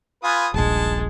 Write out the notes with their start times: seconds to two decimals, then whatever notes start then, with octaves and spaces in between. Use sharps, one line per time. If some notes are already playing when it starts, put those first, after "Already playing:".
0.23 F4 B4 G#5 D#6
0.54 D#1 A#1 G#3 A5